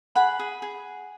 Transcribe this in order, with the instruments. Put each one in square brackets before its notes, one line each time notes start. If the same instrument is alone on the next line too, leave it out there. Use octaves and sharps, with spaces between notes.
[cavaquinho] G#4 F#5 B5
G#4
G#4